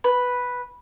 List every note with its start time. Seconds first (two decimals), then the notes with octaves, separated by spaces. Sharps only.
0.04 B4